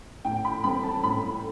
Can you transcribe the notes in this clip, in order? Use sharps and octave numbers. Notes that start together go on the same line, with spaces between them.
A2 G5
B5
G3 C4 B5
A5
A2 B5